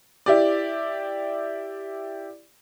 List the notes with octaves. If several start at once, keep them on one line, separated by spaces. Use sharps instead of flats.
E4 G4 D5